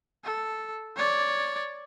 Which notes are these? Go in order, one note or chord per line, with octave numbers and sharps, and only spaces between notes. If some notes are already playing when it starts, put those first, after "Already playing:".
A4
C#5 D5